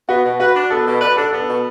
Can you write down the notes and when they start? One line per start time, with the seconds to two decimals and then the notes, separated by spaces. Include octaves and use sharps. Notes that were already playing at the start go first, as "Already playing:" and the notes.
0.08 B3 F#4
0.24 B2
0.39 F#4 B4
0.55 D4
0.70 B3 A4
0.86 B2
1.01 B4 D5
1.17 D4 A4
1.32 B3 A4
1.48 B2